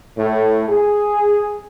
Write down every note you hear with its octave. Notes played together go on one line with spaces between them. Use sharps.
A2
G#4